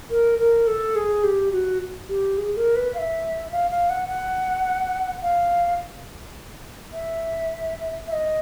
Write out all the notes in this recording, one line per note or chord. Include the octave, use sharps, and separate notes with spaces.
A#4
A#4
A4
G#4
G4
F#4
G4
G#4
A#4
B4
F5
E5
F5
F5
F#5
F#5
F5
E5
E5
D#5